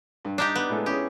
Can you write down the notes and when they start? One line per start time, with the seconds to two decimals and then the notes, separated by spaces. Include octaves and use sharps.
0.25 G2
0.38 D4 D#4 G4
0.55 B3
0.70 A2 G#3 A4
0.86 C#4 E4 G4 G#4